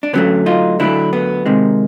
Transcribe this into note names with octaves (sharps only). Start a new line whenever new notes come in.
D4
D3 F#3 A3 B3 C#4
D#4 F4
D3 F#3 A3 D4 E4
B3
C3 D#3 G#3